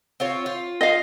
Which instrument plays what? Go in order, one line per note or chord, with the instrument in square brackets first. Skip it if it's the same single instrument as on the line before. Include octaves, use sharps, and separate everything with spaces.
[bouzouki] C4 F4 C#5
F4
[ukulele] D#5 F5